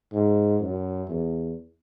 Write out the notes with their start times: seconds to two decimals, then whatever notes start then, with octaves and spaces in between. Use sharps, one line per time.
0.13 G#2
0.61 F#2
1.09 E2